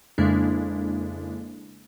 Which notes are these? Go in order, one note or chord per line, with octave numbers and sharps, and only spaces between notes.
F2 C#3 G#3 A#3 D4 E4